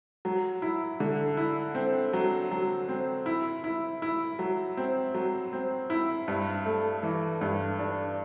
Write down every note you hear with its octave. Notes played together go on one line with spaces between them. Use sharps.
F#3
E4
D3
E4
C4
F#3
F#3
C4
E4
E4
E4
F#3
C4
F#3
C4
E4
G2
A3
E3
G2
D4